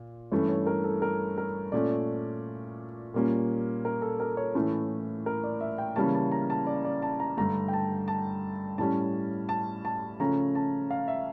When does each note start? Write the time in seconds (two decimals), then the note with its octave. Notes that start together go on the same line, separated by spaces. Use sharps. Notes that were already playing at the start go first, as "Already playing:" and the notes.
Already playing: A#2
0.32 G2 E3 A3 C#4 C#5
0.49 C#5
0.67 A#4
0.84 A4
1.02 A#4
1.38 A#4
1.72 A#2 A3 C#4 D5
3.14 A#2 G3 A#3 C#4
3.85 A#4
4.02 A4
4.20 A#4
4.37 C#5
4.55 A2 E3 A3 C#4
5.26 A#4
5.44 D5
5.61 E5
5.78 G5
5.96 C#3 E3 G3 A#3 C#4 A5
6.15 A5
6.32 A#5
6.50 A5
6.67 D5
6.85 D5
7.02 A5
7.20 A#5
7.37 G2 D3 A3 A#5
7.68 G5
7.73 A5
8.08 A5
8.78 A2 G3 C#4 A5
9.49 A5
9.85 A5
10.20 C#3 F3 A3 C#4 A#5
10.55 A5
10.90 F5
11.08 E5